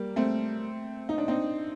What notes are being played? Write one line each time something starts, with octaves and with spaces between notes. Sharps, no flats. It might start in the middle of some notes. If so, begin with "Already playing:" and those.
Already playing: G3 A#3
A3 C4
D#4
D4
C4 D#4